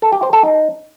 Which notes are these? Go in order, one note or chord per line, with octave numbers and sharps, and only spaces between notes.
A4
G4
C5
A4
D#4